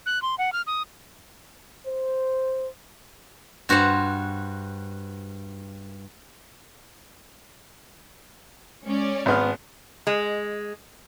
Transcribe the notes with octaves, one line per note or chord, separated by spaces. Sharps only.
F#6
C6
F#5
F6
D#6
C5
G2 F#4 C5 F5 F#5
G#3 C#4 D5
G#1 B3 F6
G#3